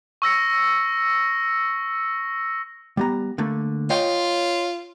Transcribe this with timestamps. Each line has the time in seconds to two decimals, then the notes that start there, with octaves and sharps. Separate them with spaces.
0.22 C#6 E6 A#6 C#7
2.97 G3 B3 A#5
3.38 D3 A3 A#3
3.90 F4 C#5 D#5 G5